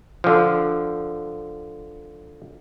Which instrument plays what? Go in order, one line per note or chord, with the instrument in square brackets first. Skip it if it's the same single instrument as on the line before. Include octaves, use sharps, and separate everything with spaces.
[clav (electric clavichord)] D3 F3